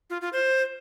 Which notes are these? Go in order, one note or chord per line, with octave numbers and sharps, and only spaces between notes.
F4
F4
C5